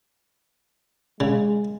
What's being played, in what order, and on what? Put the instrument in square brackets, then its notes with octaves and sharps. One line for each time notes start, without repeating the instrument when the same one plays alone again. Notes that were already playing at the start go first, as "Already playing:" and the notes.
[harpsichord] C#3 [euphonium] G#3